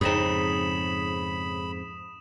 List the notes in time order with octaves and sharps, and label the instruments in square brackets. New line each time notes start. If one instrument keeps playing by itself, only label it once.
[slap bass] F2 G#2 [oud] C#3 C4 D#4 [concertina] B5 [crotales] D#6 E7